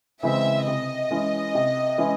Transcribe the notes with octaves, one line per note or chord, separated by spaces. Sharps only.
C#3 E3 G#3 C4 E5
C3 D#5
E3 G#3 C#4 E4
C3
E3 G#3 C#4 E4